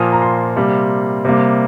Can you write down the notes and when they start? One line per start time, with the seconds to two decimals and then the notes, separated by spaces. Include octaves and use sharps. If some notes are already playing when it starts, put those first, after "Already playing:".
Already playing: A#2 F3 A#3 D#6
0.12 A#5
0.22 C6
0.56 C3 G3 A#3
1.25 C3 G3 A#3